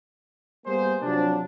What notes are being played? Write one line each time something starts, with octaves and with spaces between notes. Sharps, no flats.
G3 A#3 B3 G#4 C5
C3 F3 F#3 D4